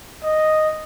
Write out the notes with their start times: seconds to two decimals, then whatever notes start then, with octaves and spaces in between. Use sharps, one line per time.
0.23 D#5